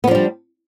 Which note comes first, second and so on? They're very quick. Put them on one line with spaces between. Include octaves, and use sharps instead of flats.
B3 F3 D4 G3